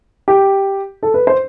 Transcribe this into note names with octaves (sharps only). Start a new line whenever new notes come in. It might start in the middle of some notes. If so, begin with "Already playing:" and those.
G4
A4
B4
C5